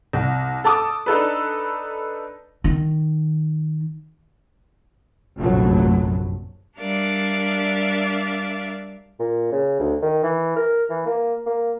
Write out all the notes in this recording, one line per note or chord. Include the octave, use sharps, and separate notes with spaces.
C2
A4 A5 D6 D#6
D4 D#4 A4 B4
D#3
F1 A#1 F#2 A2 F#3 A3
G3 D4 A#4 D5 E5 F5
A#2
C#3
D2
D#3
E3
A#4
E3
A#3
A#3